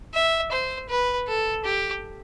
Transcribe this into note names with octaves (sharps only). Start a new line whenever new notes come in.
E5
C5
B4
A4
G4